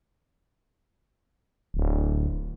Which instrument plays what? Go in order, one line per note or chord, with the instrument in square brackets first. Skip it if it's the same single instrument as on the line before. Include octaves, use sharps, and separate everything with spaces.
[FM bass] D1